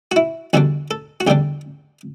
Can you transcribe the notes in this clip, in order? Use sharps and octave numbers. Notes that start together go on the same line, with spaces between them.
F#4
E4
E2 D3 G3 D4 F#4
A4
F#4
E2 D3 G3 D4 G4